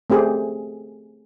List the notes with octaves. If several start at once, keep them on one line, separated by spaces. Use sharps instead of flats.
A3 C4 G4 G#4